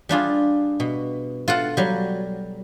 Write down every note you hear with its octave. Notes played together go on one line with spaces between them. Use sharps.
G3 D4 F4 G#4
B2
F4 A4 F#5
F#3 G3